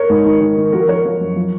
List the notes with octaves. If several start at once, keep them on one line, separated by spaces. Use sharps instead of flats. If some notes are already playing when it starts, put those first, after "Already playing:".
Already playing: A#4 C#5
G#2
D#3
D#3
D#3
F3 F#4 A#4
F3 A#4 C#5
F3
F#2
F3